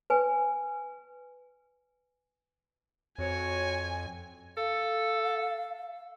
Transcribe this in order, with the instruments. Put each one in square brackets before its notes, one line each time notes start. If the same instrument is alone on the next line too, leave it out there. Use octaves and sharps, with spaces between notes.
[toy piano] B4 G#5
[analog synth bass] F2 [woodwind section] C4 F#4 C#5 [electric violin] G#5
[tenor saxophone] A4 [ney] F5